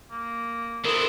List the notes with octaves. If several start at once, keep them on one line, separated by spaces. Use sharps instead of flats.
A#3
D3 C4 E4 A4 A#4 D#6